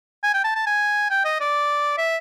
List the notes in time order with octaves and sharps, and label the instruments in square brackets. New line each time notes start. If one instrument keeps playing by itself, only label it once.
[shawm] G#5
G5
A5
A5
G#5
G5
D#5
D5
E5